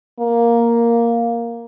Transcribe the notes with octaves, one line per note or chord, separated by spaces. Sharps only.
A#3